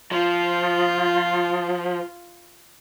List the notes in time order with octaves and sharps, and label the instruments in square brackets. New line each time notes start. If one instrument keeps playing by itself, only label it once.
[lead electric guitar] F3 [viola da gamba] F4